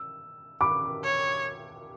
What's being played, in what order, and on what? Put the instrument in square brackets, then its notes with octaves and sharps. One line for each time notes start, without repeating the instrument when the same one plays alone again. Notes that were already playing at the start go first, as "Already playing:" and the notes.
Already playing: [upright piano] E6
B5 D6
[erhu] C#5